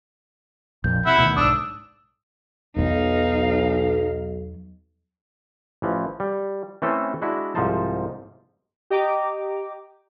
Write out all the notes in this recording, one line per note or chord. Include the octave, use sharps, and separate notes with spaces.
A#1 F2 A#2 G6
C3 E4 E5 F#5
D2 B2 D#3
B1 G#2 D4 D#6 E6
B1 E2 F#3 D#4 F5
A1 E3 F3
G3
E3 A3 C4 C#4 A4
G#3 D4 E4 F#4
C2 G#2 F3 D#4 C5 A5
G4 D#5 G5 A#5 D6